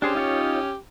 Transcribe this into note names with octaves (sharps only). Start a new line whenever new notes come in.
C#4 D4 G4 G#4 C5
D#4 F4 C#5